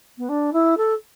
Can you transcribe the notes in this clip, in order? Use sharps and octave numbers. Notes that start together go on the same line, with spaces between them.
B3
D4
E4
A4